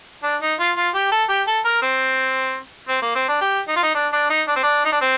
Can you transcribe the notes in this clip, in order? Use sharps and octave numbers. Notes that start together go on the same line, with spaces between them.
D4
D#4
F4
F4
G4
A4
G4
A4
A#4
C4
C4
A#3
C4
D4
G4
D#4
F4
D#4
D4
D4
D#4
D4
C4
D4
D#4
D4
C4